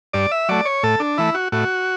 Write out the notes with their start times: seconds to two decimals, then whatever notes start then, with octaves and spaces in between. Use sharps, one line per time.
0.13 G2 D5
0.31 E5
0.49 F#3 A3 D5
0.65 C#5
0.83 A2 A4
1.00 D4
1.18 E3 A3 E4
1.35 F#4
1.52 A2 F#4